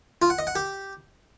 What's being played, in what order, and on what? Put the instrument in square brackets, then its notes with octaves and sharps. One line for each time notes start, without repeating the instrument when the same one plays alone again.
[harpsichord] F4
F#5
D#5
F#5
G4